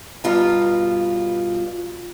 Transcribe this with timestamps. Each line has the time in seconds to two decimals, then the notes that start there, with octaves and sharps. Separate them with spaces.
0.24 G2 B2 F4 B4 A#5